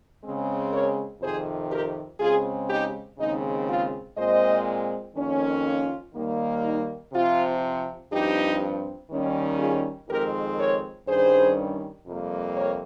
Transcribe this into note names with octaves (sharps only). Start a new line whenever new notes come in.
C#3 G#3 C4
A#4 C#5
F2 C3 D#3 G#4 C5
G4 A#4
C#3 G#3 C4 F4 G#4
D#4 G4
D#2 C#3 G#3 C4 D#4
F4
A#2 G#3 C4 C5 D#5
F2 D#3 A#3 C#4
F4
D#2 D#3 G3 A#3
D#4
C3 F3 C4 F4
G2 F3 C4 D#4 G4
D#2 D#3 G3 C#4
F4 G#4
F2 D#3 G#3 C4 G4 A#4
A#4 C#5
G2 D#3 G3 C#4 G#4 C5
F2 C3 G3 A#3
A#4 C#5